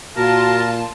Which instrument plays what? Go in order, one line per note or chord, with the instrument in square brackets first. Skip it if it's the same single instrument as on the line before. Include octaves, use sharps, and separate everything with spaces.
[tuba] A#2 [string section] F4 A5 [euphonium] F#4 [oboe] A#4